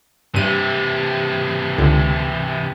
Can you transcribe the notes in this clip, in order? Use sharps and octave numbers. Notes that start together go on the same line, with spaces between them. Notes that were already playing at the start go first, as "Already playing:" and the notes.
G2 C3 E3 D#7
C#2 D3